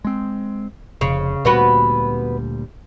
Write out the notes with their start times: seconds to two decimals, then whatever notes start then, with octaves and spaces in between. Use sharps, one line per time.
0.05 G#3 C4
1.01 F1 C#3
1.45 D2 A#2 G3 B3 F#4 B4